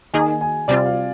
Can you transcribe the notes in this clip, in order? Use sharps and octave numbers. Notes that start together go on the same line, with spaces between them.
D#3 A#3 D#4 G#4 D#5 G#5
G#5
C3 G3 C4 F4 D5
F5